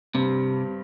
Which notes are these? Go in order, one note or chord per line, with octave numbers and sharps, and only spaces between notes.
G2 C3 G3 C4